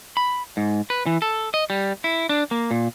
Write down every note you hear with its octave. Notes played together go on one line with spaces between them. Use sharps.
B5
G#2
B4
E3
A4
D#5
G3
E4
D4
A#3
A#2